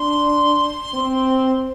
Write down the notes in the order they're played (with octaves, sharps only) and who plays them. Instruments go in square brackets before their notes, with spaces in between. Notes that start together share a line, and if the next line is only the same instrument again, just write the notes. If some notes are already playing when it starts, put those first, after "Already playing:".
Already playing: [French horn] D4 [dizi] C6
[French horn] C4